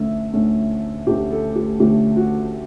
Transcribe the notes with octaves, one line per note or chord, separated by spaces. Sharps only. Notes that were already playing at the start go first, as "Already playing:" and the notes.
Already playing: D2 D3 A3 C#4 E5
D2 D3 A3 C#4
D2 D3 A3 C#4 G4
A4
G4
D2 D3 A3 C#4 G4
F#4